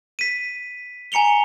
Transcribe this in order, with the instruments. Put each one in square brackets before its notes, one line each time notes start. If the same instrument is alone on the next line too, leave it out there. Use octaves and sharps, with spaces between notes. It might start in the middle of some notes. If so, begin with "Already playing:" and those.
[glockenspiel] B6 D#7
G#5 A#5 C#7 F7 G7